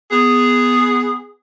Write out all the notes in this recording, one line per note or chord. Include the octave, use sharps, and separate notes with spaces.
B3 G#4